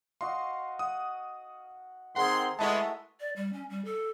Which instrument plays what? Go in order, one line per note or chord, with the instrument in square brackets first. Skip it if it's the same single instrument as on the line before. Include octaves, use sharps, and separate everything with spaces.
[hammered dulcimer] F#4 D#5 F5 [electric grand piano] C6
[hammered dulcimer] F#5 [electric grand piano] D#6
[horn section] D#3 C4 C6 [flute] G#4 [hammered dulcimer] A#4 [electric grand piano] F#5
[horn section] G#3 B3 [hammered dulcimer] A3 E4 F#4 [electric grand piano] D#5 A5 [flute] E5
[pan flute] D5
G3
C#4
G3
A4